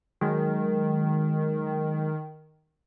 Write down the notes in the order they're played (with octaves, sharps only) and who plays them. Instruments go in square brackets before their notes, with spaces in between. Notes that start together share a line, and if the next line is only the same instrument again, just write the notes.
[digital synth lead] D#3 [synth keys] F#3 G#3